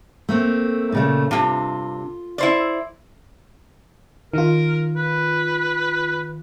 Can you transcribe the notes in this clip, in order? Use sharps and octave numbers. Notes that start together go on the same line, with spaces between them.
A3 A#3 C4
A#2 C#3 A3
G2 C3 F4
E4 C5 D5
D#3 F4 A#4
B4